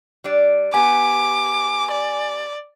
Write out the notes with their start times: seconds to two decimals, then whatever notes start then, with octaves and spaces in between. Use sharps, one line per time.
0.24 G3 D4 D5
0.74 B3 G4 G#5 D6
1.91 D5